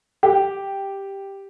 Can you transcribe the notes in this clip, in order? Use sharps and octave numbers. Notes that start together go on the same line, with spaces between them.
G4